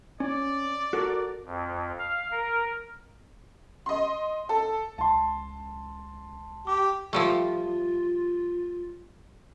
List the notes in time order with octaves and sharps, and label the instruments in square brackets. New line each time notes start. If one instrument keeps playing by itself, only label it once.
[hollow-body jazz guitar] C#4 [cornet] D5
[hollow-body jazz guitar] F#4 A4 A#4
[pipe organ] F2
F5
A#4
[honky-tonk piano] D#5 C6
A4
[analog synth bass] C#2 [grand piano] A5 C6
[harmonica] G4 [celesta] D6
[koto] F3 G3 A3 [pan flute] F4